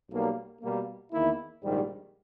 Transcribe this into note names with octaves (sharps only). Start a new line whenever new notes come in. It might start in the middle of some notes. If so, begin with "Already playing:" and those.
B1 B2 G3 A#3
B2 G3 A#3
E2 D#3 A#3 E4
A#1 G#2 D#3 G3